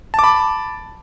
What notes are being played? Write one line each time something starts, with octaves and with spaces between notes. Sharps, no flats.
A5 B5 D6